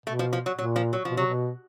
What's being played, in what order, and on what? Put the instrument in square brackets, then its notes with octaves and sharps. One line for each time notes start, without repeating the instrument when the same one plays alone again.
[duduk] B2 [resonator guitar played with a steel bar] A3
[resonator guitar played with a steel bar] F3
F3
F#3
[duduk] A#2 [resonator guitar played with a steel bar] F#3
[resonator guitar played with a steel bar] F3
F#3
F3
[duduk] B2
[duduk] C3 [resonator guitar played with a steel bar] F#3
[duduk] B2